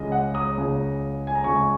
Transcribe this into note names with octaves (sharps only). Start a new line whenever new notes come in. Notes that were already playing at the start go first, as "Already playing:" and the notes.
Already playing: C#2 C#3 G#3 D#5
F#5
A#5 D#6
C#2 C#3 G#3
G#5
A#5
C#2 C#3 G#3 G#5 C#6